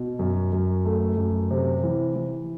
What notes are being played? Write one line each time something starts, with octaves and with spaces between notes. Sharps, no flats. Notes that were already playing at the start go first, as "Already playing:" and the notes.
Already playing: B2
F#2
F#2
A3
F#2
C3
E3
E3